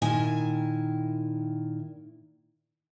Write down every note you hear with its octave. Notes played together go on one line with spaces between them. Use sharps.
A#2 D#3 E4 G#5